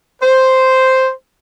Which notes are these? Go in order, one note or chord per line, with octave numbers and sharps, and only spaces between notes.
C5